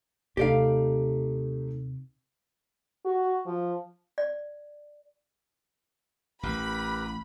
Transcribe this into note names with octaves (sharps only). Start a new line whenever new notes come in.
D#2 C3 A3 D#4 G4 D5 F5
F#4
F3
D5
A1 G4 A#4 B4 B5